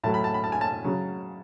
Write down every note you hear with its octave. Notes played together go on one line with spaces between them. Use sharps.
A2 F#3 A3 A5
B5
A5
B5
A5
G#5
A5
C#3 F#3